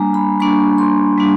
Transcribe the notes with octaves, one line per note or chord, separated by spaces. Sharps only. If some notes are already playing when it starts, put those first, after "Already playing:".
Already playing: G3 A#3 D4 G#5 A#5
B5
G3 A#3 D4 C#6
C6
G3 A#3 D4